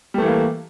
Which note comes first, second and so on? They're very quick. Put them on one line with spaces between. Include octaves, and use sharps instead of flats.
G3 A3 E3 A#3